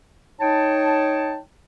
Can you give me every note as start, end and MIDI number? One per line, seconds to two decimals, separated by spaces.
0.40 1.38 63
0.40 1.38 73
0.40 1.38 79
0.40 1.38 81